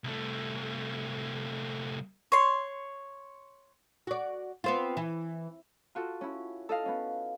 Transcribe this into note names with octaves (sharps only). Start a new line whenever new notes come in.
C2 A3
C#5 C6
F#4 D5
B3 C4 F4
E3
F4 F#4 A4
C#4 E4
A4 D#5 F5
B3 C#4